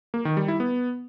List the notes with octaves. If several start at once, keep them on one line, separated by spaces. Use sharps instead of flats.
A#3
D#3
G3
E4
B3